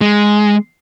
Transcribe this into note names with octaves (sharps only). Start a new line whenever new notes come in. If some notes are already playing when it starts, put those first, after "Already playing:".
G#3